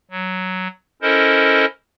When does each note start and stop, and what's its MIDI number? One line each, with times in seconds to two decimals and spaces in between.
0.11 0.68 54
1.02 1.65 61
1.02 1.65 64
1.02 1.65 69
1.02 1.65 70
1.02 1.65 72
1.02 1.65 75